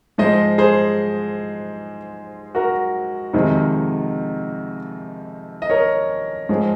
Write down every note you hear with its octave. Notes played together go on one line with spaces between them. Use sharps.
G#2 F3 G#3 C5 D#5
G#4 C5
F#4 A#4
F2 C3 D#3 G#3
D#5
A#4 C#5
G#2 F3 G#3